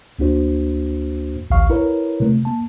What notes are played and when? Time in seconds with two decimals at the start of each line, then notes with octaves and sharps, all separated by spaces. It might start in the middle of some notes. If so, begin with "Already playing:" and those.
0.19 D2 A#3 D4 F#4 C5
1.50 A1 D2 F5 C#6
1.70 E4 A#4 B4 C#5
2.20 C3 A3
2.45 A#3 A5